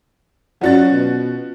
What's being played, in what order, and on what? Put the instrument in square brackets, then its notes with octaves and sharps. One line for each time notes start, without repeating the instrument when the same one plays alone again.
[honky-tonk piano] F3 F#4 A6 [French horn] F#3 [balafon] C#4 D5 F#5
[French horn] B2